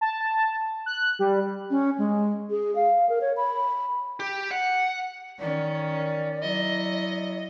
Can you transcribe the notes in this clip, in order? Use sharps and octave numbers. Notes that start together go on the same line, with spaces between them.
A5
F#6
G3
C#4
G#3
G#4
F5
A#4
C#5
B5
G4
F#5
D#3 C#4 D5
F#3 E4 D#5